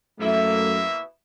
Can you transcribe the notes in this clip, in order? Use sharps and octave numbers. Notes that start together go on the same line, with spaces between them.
F#2 B2 A3 A#3 E4 E5